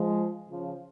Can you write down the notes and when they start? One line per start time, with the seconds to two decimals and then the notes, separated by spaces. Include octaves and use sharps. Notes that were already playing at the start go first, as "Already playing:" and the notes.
Already playing: F3 G#3
0.48 C#3 F3